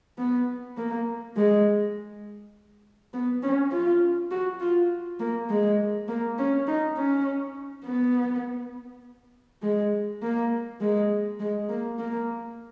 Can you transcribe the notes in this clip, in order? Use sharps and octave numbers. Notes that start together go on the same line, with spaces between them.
B3
A#3
G#3
B3
C#4
F4
F#4
F4
A#3
G#3
A#3
C#4
D#4
C#4
B3
G#3
A#3
G#3
G#3
A#3
A#3